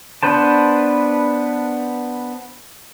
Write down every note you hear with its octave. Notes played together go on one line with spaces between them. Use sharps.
B3 D4 B4 C5 A5